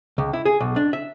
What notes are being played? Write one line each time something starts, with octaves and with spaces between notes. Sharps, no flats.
C#2
E4
G#4
B1
D4
E5